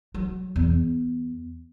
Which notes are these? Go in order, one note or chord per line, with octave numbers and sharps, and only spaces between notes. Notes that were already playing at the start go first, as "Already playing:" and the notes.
F#3
E2